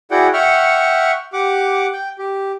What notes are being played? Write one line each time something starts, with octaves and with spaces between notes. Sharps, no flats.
E4 F#4 G#4 D5 F#5 G5
E5 F#5 G5 C#6 F6
G4 F#5 D6
G5
G4